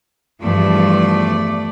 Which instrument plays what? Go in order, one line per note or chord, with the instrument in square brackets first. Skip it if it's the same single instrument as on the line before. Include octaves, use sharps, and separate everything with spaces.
[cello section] E2 G2 F3 [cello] A3 D5